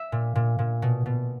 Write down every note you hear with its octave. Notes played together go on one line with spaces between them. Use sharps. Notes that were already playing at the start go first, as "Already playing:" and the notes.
Already playing: E5
A#2
A#2
A#2
B2
B2